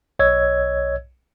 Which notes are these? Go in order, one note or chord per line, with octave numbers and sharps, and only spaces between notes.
B1 C#5 D#5 E6 G#6